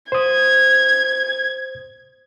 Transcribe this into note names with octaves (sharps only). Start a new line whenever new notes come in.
C5 D#6 G#6